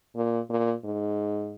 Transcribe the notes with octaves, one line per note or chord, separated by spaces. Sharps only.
A#2
A#2
G#2